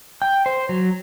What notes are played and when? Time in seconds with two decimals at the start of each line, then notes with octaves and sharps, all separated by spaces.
0.22 G5
0.46 C5
0.69 F#3